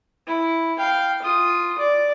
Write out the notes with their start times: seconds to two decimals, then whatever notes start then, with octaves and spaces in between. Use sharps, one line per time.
0.27 E4
0.78 F5 G5
1.22 F4 D#6
1.79 D5